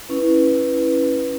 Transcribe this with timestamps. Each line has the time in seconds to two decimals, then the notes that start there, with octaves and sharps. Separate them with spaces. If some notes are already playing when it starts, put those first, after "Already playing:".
0.09 C#4 E4 B4